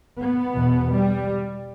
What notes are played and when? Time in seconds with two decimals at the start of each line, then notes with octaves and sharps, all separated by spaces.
0.19 B3
0.55 E2 B2
0.92 G3